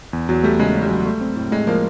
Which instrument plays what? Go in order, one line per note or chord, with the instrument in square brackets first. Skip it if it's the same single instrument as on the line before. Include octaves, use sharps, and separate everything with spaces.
[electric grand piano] E2
[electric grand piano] E2 [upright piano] F#3
[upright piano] G3 [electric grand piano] A3
[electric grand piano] C#3 [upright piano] G#3
[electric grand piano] C#3
[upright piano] G3
[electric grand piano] F#3
A3
C4
A2
[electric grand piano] A2 [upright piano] G#3
[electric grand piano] F3 [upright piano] A#3